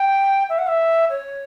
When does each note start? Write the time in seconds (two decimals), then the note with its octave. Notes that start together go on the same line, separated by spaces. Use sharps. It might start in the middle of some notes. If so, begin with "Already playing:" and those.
Already playing: G5
0.49 E5
0.59 F#5
0.67 E5
1.10 C#5